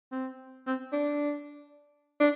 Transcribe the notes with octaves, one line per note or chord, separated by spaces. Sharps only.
C4
C4
D4
D4